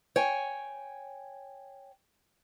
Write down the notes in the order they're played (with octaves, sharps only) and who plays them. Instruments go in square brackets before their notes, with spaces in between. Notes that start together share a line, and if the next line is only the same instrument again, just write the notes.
[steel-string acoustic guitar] C#5 G5 G#5